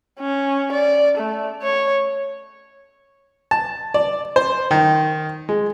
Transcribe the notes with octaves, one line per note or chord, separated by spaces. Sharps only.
C#4
D5
A3
C#5
A5
D5
C5
D#3
G#3